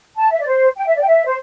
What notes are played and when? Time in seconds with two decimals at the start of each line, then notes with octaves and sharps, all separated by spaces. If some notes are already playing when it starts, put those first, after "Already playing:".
0.17 A5
0.32 E5
0.40 D5
0.47 C5
0.76 G5
0.86 E5
0.96 D5
1.01 G5
1.06 E5
1.25 C5